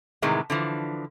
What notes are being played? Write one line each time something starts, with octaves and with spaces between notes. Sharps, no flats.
A2 C3 D#3 E3 G#3
D3 E3 F3